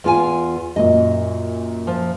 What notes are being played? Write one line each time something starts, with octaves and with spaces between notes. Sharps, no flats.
E2 F4 G#5
F#2 A#2 D#5
F3